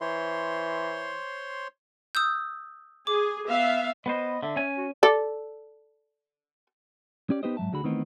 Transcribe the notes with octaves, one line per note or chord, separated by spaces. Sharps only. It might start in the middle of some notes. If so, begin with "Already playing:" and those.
E3 C5 C#5 C6
D#6 E6 G6
G#4 D6
B3 E5 F5
B3 B4 C5 D#5
D3 E5
C#4 G#5
F#4
A4 D5
C#4 G4 D5
B3 D#4 G4 B4 C5 D#5
G#2 C3 F#3 E5 A5
D2 D3 F#4 G#4 B5
D#3 E3 A3 B3 C4 D#4